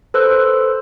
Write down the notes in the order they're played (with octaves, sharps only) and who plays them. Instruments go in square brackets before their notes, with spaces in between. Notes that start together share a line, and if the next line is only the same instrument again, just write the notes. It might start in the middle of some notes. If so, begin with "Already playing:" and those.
[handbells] A4 B4 C5 E6 F#6